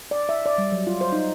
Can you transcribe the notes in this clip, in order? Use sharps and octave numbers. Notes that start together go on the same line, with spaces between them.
D5
E5
D5
G3
F#3
F4
C5
D#4